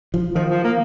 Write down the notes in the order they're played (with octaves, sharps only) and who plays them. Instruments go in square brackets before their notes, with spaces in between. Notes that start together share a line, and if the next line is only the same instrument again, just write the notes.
[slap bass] F3
[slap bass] D#3 [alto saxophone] F3
[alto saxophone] F3
A#3